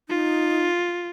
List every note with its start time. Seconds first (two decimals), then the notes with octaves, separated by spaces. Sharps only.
0.09 D#4 F4